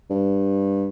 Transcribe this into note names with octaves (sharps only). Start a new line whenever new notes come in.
G2